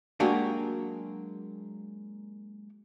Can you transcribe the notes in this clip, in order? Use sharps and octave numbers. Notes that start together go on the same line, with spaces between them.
F#3 G#3 A#3 D4 F#4 G4